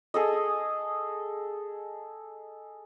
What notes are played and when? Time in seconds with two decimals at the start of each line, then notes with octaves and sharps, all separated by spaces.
0.14 G#4 A4 D#5